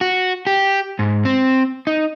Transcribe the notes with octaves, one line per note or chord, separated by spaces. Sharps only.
F#4
G4
G#2
C4
D#4